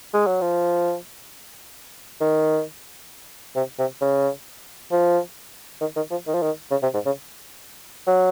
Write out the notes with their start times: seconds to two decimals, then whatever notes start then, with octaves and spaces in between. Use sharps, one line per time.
0.14 G#3
0.26 F#3
0.41 F3
2.21 D#3
3.56 C3
3.79 C3
4.01 C#3
4.92 F3
5.81 D#3
5.96 D#3
6.11 F3
6.27 D#3
6.34 F3
6.42 D#3
6.71 C#3
6.83 C3
6.94 G#2
7.06 C#3
8.07 F#3